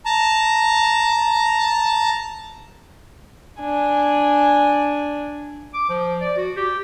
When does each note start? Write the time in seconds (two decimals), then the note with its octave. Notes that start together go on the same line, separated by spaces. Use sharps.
0.06 A5 A#5
3.61 D4 G#5
5.74 D6
5.89 F3
6.21 D5
6.37 F#4
6.56 G4